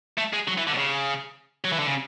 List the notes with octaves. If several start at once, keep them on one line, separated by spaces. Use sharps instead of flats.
A3
G#3
F#3
E3
D3
B2
C#3
F#3
E3
D3
C#3